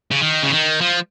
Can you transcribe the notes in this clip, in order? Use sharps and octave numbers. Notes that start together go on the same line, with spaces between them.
C#3
D#3
C#3
D#3
F3